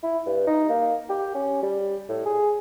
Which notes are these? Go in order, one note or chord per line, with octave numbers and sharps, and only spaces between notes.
E4
G2
D#4
A#3
G4
C#4
G3
A2
G#4